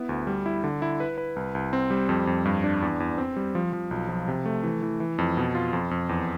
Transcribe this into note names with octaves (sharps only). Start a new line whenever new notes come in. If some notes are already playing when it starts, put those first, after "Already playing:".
Already playing: B3 E4
D2
G3
E4
D3
E4
B4
B4
C2
C2
C4
G3
F2
F2
G2
D4
E2
E2
C4
G3
F3
F3
B1
F3
C3
A3
E3
E3
E3
F2
B2
F4
F2
F2
E2